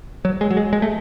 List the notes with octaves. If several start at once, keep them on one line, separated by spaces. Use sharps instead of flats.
F#3
G#3
F#3
G#3
G#3
A3